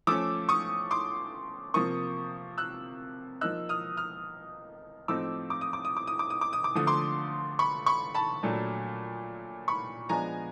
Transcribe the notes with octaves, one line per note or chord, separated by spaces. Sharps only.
F3 A3 C#4 D6 E6
C#6 D#6
C6 D6
C3 F3 A#3 C#6 D#6
E6 F#6
F3 A#3 D#4 E6 F#6
D#6 F6
D#6 F6
A2 F3 A3 C4 D#4 D6 E6
D6
D#6
D6
D#6
D6
D#6
D6
D#6
D6
D#6
D6
D3 F3 A3 D#6
C6 D6
B5 C#6
B5 C#6
A5 B5
A#2 F#3 A3 D4
B5 C#6
F3 G#3 B3 D4 G#5 A#5